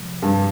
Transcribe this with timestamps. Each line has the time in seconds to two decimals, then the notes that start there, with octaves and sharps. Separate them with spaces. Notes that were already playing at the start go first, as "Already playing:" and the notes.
Already playing: C3 F3 G#3
0.22 G2